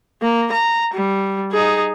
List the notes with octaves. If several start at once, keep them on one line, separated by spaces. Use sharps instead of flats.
A#3
A#5
G3
D#4 G#4